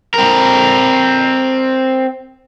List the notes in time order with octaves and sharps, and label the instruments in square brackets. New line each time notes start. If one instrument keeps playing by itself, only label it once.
[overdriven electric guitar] C4 A#4